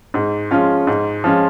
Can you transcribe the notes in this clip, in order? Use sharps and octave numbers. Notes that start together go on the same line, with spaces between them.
G#2
F3 G#3 C#4 F4
G#2
F3 G#3 C#4 F4